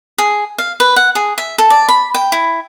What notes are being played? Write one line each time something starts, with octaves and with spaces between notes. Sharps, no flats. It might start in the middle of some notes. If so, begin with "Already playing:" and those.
G#4
F5
B4
F#5
G#4
E5
A4
D5
B5
G5
E4